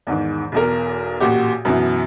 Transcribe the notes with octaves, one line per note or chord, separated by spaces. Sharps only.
E2 G#2 D#3
B1 E2 A#4
A1 A#2 F#4 G4
F#2 B2 E3